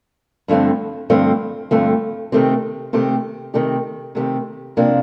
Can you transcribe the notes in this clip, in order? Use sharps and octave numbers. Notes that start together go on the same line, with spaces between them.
G2 D3 F3 A3 C4
G2 D3 F3 A3 C4
G2 D3 F3 A3 C4
C3 D#3 A3 C4 G4
C3 D#3 A3 C4 G4
C3 D#3 A3 C4 G4
C3 D#3 A3 C4 G4
F2 C3 F3 A#3 D4